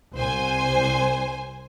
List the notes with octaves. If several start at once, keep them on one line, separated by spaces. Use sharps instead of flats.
C2 C5 G#5